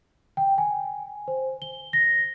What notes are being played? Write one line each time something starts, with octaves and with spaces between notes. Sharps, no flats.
G5
G#5
C5
G7
A#6